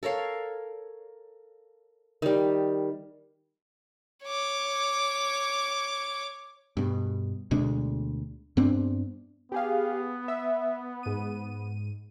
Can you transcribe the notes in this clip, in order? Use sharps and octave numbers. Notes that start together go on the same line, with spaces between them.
A4 A#4 C#5 F5
D#3 G3
C#5 D6
G2 B2
D2 B2 G#3 D4
G2 B3 C4 D4
B3 G4 G#4 F5
E5
G#2 D#7